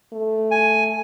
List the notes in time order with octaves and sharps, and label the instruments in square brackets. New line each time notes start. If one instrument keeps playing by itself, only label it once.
[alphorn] A3
[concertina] G#5